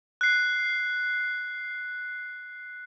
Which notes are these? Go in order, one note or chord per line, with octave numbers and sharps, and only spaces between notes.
F#6 C7